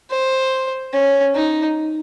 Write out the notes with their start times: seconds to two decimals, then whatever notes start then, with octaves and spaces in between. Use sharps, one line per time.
0.10 C5
0.93 C#4
1.35 D#4